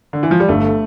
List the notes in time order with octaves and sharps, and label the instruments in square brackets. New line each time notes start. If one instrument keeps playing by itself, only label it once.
[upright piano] D3
E3
F3
G3
[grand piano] G1 [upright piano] A3